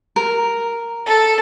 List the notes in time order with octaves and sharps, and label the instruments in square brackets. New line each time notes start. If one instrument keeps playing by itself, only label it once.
[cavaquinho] A#4
[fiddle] A4